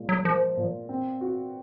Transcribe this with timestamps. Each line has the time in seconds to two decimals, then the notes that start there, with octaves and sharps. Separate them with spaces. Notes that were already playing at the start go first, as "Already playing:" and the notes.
Already playing: A#2 G#3
0.09 F#3
0.25 F3 A#4
0.57 A#2
0.89 C4
1.21 F#4